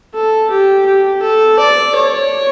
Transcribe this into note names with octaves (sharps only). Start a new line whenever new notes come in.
A4
G4
G4
A4
D5
C#5